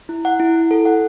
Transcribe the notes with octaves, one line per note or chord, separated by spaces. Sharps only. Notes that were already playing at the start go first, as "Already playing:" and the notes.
E4
F#5
E4
E4
A4
F#5